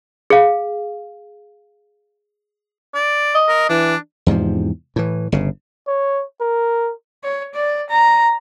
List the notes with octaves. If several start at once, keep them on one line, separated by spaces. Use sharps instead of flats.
G#4 F5
D5
D#5
A#4
E3 D4
E2 G#2 C3 F3
A2 E3
G1 C#3
C#5
A#4
C#5
D5
A#5